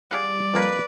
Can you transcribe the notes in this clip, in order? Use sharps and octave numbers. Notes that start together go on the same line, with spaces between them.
G3 G#4 D5 F5 F#5
F2 F3 A#3 B4